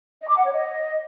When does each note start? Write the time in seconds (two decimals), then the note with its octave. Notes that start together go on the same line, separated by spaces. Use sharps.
0.20 D#5
0.28 D6
0.37 F#5
0.45 C#5
0.53 D#5